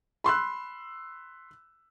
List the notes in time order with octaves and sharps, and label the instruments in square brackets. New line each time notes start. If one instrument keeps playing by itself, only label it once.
[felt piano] B5 C6 E6 F#6